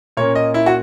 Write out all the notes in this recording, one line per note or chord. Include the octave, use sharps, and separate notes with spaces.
A#2 A#3 C#4 C#5
D#5
E4
F#4